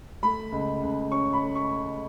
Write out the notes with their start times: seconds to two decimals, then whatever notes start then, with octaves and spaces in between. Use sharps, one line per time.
0.23 A3 B5
0.52 C#2
0.82 C#2
1.11 C#4 C#6
1.33 B5
1.41 A3
1.55 C#6